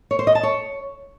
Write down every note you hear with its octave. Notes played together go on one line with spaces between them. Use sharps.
C#5
C5
D#5
A5
C#5